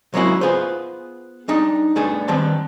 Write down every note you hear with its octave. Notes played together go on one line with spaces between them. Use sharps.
F#3 G#3 A#3 C#4 E4 F#4
B3 F4 G#4 B4 C5
G3 D4 D#4
G3 A3 B3 D4 G#4 A4
D#3 G3 B3 C4 A5